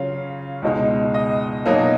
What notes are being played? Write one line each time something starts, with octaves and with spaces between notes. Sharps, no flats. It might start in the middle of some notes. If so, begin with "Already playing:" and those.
Already playing: C#3 F#3 C#4 F4 F5
C#2 B2 G#3 D#4
D#5
B2 F#3 A#3 D#4